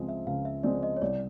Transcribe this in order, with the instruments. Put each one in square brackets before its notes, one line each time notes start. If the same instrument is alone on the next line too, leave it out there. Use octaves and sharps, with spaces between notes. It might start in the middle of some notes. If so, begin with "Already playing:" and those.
Already playing: [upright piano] C#2 C#3 F3 G#3 C4
[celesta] E5
[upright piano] C#2 [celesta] F5
[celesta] E5
[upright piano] C#3 F3 G#3 C4 [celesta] D5
[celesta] D#5
C#5
[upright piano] C2 [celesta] D5